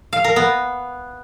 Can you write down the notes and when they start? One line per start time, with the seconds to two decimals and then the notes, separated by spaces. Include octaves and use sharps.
0.13 F5
0.24 A#4
0.36 B3